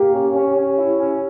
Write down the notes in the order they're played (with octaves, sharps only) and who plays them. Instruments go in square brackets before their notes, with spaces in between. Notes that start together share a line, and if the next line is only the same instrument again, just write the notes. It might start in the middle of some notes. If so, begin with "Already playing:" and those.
Already playing: [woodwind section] A#3 [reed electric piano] G4
[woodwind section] C#4
C#4
C#4
E4
C#4